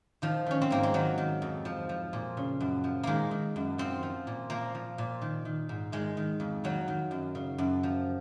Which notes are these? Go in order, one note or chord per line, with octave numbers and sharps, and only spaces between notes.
D#3 F3
D#3 C#4
C4
G#2 A#3
G#3
D#3 F#3
D#3
F2
F3
F3
A#2
C#3
F#2
F3
D#3 G#3 A#3
D#3
F#2
F3 C4
F3
A#2
F3 A#3
F3
A#2
D#3
D#3
G#2
D#3 G#3
D#3
F2
D#3 F#3
D#3
F#2
C#3
F#2
F3